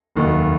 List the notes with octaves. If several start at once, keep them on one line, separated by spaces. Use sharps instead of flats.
F1 D#2 D#3 F#3